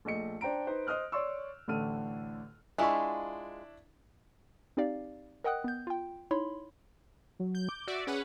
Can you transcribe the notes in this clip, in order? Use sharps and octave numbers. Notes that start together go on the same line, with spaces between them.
A#1 A3 D#5 C#7
D4 C5 G5 A#5 D7
D#4 B4 C5
C5 D#5 D#6 F6 F#6
C#5 D5 C6 C#6 E6
A1 A2 D3 A4 F6 D#7
G#3 D4 E4 F4 E5 C#6
C4 D#4 G4 D5 F5
A#4 D#5 F#5 G5 D#6 F#6
B3 G6
F4 G5
D#4 E4 C#5 B5 C6
F#3
G6
D6
F#4 D5 E5 D7
C#4 G#4 B4 F#5